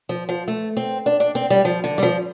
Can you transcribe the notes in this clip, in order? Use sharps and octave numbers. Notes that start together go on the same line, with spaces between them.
F3
F3
A3
C4
D4
D4
C4
G3
F3
D3
G3
F3